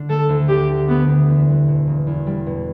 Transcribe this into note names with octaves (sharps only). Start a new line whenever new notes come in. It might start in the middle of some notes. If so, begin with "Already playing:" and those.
Already playing: D3 D4
A3 A4
D2
D3 G4
D4
A3 B3
D2
E2
G3
B2
E1
E2
G3
B2